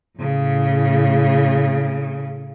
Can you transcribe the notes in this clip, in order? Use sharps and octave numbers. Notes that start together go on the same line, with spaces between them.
A2 C#3